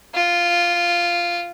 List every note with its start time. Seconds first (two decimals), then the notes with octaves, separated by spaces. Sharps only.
0.15 F4